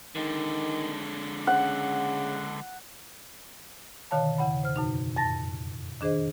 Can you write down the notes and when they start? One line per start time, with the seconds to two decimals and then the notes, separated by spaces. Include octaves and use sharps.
0.16 D3 D#3 G#3
1.47 C#3 F#5
4.11 B2 D3 D#3 C#5 F5 A5
4.38 E2 C#3 F#5 B5
4.63 C5 F6
4.76 F#2 B2 D#4
5.16 F2 A2 A5 A6 A#6
6.01 D#3 D4 G#4 C5 D#5